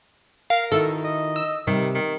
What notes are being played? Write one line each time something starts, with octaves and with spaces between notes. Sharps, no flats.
A#4 F5
D#3 E4 F#4 A4
D#5
E6
C3 D#3 G3 C4
D#3